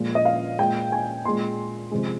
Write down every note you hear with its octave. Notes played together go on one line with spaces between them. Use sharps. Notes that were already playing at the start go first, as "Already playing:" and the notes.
Already playing: A#2 F3 G#3
D#5
F5
A#2 G#3 G5
G#5
A#2 G#3 C6
C3 F3 G#3